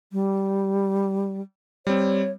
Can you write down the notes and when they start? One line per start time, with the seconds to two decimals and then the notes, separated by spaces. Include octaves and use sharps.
0.13 G3
1.87 G3 C4 C#5